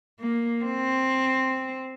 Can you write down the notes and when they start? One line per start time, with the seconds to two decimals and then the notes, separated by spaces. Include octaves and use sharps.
0.20 A#3
0.65 C4